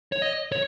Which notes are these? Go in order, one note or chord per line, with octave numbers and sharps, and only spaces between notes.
C#5
D#5
C#5